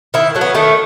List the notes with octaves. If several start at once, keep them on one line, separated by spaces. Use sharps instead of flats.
D#3 E4
F#3 A3
B3
D#3 A3